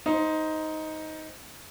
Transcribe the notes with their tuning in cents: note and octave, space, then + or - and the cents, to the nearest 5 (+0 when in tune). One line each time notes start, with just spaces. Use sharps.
D#4 +10 C5 -5